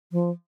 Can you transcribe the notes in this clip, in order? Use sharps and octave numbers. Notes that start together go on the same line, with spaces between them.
F3